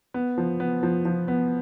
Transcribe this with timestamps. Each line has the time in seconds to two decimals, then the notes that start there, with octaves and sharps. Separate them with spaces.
0.14 B3
0.38 F3
0.60 B3
0.83 F3
1.05 F3
1.28 B3